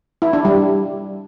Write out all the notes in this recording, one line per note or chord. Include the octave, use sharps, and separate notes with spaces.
E4
D4
G3